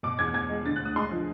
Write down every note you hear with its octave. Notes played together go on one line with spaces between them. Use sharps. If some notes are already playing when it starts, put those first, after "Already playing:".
B2 D6
E2 G#6
E2 G#6
G#3
D3 A6
D2 F#6
D#6
G#3 C6
F3